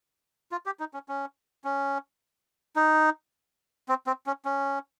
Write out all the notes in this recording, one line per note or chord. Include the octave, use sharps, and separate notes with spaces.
F4
G4
D#4
C#4
C#4
C#4
D#4
C4
C4
C#4
C#4